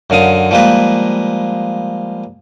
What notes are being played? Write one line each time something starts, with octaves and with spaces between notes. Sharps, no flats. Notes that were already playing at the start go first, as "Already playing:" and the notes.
F#2 D3 F5 D#6
F3 G3 G#3 A#3 B4